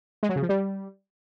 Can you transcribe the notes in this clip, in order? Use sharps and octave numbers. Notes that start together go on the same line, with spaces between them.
G#3
F#3
C#3
F3
G3